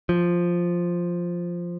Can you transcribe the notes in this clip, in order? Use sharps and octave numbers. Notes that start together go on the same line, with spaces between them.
F3